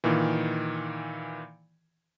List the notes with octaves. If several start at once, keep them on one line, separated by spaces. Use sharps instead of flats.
A#2 D#3 E3